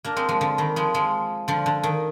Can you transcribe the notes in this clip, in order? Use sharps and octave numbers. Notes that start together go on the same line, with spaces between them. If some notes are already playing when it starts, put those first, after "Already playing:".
A#3 D4
G#3 C4
F3 G#3
D3 F3
D#3 G3
F3 G#3
F3 G#3
D3 F3
D3
D#3